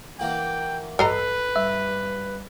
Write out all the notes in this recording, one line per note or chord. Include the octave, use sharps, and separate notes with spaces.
E3 A#3 F#4 G5
A1 G2 A4 B4 D#5 A#5 C7
G2 E5